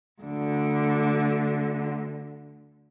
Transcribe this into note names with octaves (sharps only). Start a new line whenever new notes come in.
D2 D3